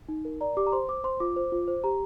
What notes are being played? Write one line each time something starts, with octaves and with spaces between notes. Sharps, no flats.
D#4
A#4
D5 A#5
G4 D6
A#5
C5 C6
C5 D6
C5 C6
F4 D6
C5
F4
C5
G4 A#5